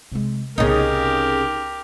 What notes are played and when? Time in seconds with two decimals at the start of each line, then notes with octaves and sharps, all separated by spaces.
0.12 C3 G#3
0.58 C2 C#3 B3 D#4 G4 A#4